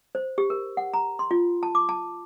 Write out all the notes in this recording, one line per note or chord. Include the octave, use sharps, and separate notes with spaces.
C5
G4
A#4
F#5
A#5
C6
F4
A5
D6
A5